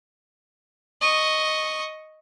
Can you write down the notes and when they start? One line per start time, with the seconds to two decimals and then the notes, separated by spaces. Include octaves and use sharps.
1.02 D#5 C#6